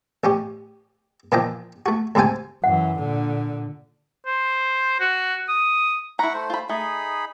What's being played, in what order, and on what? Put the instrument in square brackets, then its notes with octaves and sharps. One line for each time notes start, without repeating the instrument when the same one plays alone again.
[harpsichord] A1 C#4 G4
A#2 E3 F3 D4 D#5 G5
A3 F#4
D2 G#2 C3 A4 G5 G#5
[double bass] F#2 E3 [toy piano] F#5
[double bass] A#2 D3
[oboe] C5
F#4
D#6
[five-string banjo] E4 A#5 [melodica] F#5 B5 C#6
[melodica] A3 C5
[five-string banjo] F4 B5
[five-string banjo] A3 [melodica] D#4 G#4 B5